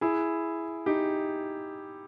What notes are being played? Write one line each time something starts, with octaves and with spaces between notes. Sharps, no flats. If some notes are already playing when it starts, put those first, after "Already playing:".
E4 G#4
D#4 G4